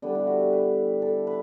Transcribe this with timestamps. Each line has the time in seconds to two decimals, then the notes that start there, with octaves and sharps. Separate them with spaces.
0.02 D3 G3 B3 D4
0.15 E4
0.27 F#4
0.40 G4
0.53 B4
1.02 A4
1.27 B4